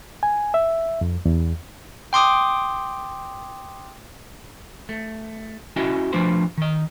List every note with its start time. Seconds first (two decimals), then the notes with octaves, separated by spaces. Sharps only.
0.23 G#5
0.54 E5
1.01 F2
1.25 E2
2.13 G5 C6 D6 D#6
4.89 A3
5.76 C#4 E4 F#4 D#5 E5 G5
6.13 F3 A3 D4 F4 B4 C5
6.58 D#3 D#5